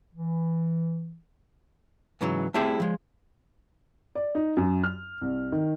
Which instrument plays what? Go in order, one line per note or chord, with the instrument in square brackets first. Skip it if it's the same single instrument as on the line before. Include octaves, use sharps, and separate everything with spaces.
[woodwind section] E3
[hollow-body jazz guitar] G#2 C#3 E3 F#3
A3 C4 E4 G4 G#4 E5
F3 G#3
[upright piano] D5
D#4
F#2
F6
C2
D#3